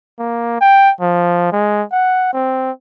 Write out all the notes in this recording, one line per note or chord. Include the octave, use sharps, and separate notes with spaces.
A#3
G5
F3
G#3
F#5
C4